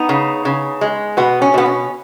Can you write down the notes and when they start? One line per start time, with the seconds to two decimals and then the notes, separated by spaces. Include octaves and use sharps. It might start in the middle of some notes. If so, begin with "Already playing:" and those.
Already playing: B3 D#4
0.09 C#3
0.45 C#3
0.81 G#3
1.17 B2 B3
1.42 C#4
1.54 B2 B3
1.66 C#4